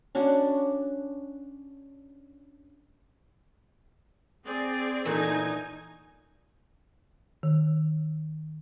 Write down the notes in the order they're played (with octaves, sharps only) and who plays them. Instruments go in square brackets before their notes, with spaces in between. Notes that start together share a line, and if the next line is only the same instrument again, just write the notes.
[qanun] C#4 D4 F#4
[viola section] C4 G#4 D5
[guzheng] A#2 E3 A3 [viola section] D3 D#4 G#5
[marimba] D#3